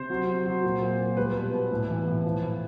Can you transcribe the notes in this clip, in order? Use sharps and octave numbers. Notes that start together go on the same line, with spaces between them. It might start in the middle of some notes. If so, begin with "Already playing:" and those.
Already playing: C3 C5
F#3
F#3
F#3
A#2
A#2
A#2
G3 B4
B2
B2
A2
E3
A2
F3
A2